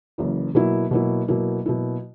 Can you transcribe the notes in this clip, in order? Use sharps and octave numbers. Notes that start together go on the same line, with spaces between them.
F#1 F#2 E3
B2 F#3 A#3 E4
B2 F#3 A#3 E4
B2 F#3 A#3 E4
B2 F#3 A#3 E4